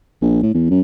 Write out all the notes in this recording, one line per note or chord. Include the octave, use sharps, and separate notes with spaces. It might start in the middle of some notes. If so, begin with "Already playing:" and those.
A#1
A2
E2
F#2